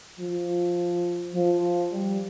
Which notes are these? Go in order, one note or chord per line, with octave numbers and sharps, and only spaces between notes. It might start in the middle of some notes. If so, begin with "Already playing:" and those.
F3
F3
G3